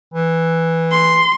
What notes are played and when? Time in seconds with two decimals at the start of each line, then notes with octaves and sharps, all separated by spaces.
0.14 E3
0.92 C6